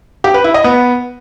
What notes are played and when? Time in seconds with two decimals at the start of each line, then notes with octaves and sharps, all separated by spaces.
0.24 G4
0.34 B4
0.44 E4
0.54 D#5
0.64 B3